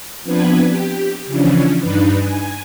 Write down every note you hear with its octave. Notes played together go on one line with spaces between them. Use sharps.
F3 B3 C4 D4 B4 G#6
G4
C#3 E3 F3 C#4 D4
G2 D4 D#4 B4
G#5